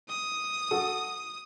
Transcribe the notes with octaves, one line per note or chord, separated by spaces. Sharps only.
D#6
F#4 A4